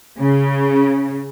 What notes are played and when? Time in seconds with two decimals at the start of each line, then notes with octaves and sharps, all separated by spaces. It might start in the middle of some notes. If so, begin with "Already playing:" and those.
0.17 C#3